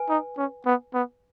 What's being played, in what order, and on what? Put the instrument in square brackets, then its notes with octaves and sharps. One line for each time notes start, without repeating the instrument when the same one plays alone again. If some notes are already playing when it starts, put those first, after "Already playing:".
Already playing: [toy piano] B4 G#5
[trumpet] D#4
C#4
B3
B3